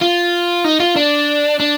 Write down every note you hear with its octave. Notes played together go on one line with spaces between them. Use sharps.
F4
D#4
F4
D4
D4